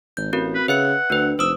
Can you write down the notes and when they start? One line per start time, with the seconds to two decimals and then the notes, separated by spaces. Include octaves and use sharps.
0.17 G#1 G6
0.33 A1 C4 F#4 A#4
0.55 B4
0.68 C#3 B4 E5 F#5 C#7
1.10 D2 D4 B4
1.39 F1 C5 D#6 E6